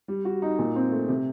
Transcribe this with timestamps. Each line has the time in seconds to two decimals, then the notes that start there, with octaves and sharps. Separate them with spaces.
0.08 G3
0.25 F#4
0.42 D#4
0.59 A#2
0.76 C4
0.91 A3
1.08 C3